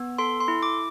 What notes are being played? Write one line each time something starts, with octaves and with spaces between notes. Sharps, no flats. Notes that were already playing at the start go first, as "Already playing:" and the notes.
Already playing: B3
A4 C6
C6
E4
D6